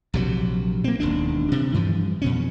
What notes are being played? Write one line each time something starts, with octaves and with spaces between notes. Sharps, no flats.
A#1 C3 F#3
A#3 C4
E1 D#2 D4
C3
G2 E3 F3
F2 B2 C#4